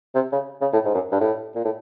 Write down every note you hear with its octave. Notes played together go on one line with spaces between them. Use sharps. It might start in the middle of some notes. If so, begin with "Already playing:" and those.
C3
C#3
C#3
A2
G#2
F#2
G2
A2
A#2
A2